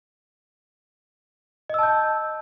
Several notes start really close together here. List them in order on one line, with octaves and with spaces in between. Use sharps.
D#5 E6 A5 G6